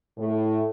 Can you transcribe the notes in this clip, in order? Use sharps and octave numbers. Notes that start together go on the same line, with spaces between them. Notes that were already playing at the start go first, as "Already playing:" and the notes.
A2